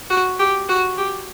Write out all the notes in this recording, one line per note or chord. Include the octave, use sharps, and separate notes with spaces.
F#4
G4
F#4
G4